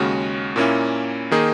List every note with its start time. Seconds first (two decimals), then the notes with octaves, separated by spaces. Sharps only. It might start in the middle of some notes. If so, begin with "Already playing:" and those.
Already playing: D#2 C#3 G#3 C#4 F#4
0.56 A#2 A#3 C#4 E4
1.31 D#3 A#3 D#4 G#4